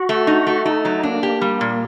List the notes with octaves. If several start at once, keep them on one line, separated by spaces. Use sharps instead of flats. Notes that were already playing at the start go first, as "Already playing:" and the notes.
Already playing: F#4
A3
D#4
A3
A3 D#4
F#3
A#3 D4
G4
G3
A#2